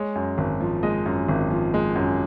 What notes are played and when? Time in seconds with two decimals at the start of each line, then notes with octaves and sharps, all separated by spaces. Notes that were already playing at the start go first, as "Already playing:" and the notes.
Already playing: G#3 C#5
0.15 F#2
0.38 G#1
0.60 F3
0.83 G#3 D#5
1.06 F#2
1.29 G#1
1.51 F3
1.74 G#3
1.96 F#2